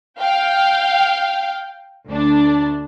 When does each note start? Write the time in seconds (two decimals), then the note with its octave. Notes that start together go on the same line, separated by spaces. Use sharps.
0.20 F5 G5
2.08 D2 D4